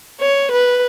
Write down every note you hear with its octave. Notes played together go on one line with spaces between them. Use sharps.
C#5
B4